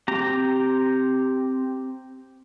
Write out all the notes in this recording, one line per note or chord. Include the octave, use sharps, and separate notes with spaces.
C4 G4 A#5